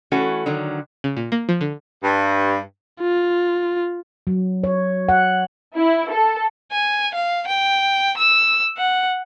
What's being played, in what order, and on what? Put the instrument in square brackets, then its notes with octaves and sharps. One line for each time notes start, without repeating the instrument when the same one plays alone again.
[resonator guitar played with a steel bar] E3 A3 C#4 F#4 A4
D3 D#3 F#3
[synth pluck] C#3
A#2
A#3
F3
D3
[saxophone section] G2
[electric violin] F4
[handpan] F#3
C#5
F#5
[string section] E4
A4
[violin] G#5
F5
G5
E6
F#5